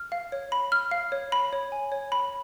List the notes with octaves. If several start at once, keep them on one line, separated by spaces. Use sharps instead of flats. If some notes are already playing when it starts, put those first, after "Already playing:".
Already playing: F6
F5
C#5
B5
F6
F5
C#5
B5
C#5
G#5
C#5
B5